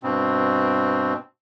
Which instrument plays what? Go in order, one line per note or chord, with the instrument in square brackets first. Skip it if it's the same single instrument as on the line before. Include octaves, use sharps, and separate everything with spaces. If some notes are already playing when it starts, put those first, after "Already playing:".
[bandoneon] G2 B2 C4